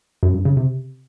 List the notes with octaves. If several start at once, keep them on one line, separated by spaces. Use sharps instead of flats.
F#2
G2
C#3
C3